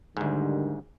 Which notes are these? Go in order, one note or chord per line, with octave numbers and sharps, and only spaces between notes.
D2 G#2 D3 D#3 G3